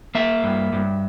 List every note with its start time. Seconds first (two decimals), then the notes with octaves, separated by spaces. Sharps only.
0.15 A#3 E5
0.44 G2
0.73 G2